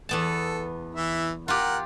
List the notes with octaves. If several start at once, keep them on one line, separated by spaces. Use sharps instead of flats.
E2 B3 A4 A5
E3 E5
F4 G4 A#4 F#5